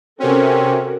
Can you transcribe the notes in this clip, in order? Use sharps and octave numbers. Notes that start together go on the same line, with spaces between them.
C3 C4 C#4 F#4 A4 A#4